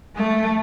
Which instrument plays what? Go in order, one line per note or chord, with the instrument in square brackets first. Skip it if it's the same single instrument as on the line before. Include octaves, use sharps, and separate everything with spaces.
[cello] A3